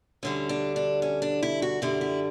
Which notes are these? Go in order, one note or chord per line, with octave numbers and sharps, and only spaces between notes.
D2 D3 G3 C#4
D4
D4
C#4
D4
E4
F#4
F#2 D3 G3 E4
E4